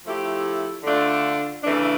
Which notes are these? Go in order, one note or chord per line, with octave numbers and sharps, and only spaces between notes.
F3 A3 E4 G4
D3 A3 D4 F4
C#3 E3 A3 D4